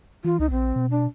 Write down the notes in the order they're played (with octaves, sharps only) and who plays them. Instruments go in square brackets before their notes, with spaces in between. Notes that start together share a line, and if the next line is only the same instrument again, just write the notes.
[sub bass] E3 [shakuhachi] F4
[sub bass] C#2 [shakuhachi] D#4
[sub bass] A#1 [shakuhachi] C4
[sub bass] B2
[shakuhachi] D4